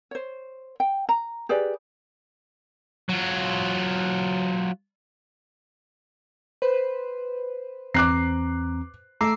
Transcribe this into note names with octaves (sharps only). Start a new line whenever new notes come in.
C5 C#5
G5
A#5
G4 G#4 B4 D5
F#3 F4
B4 C5
E2 C4 A#5 D6 F#6 C7
A3 A#5 D6 E6 C7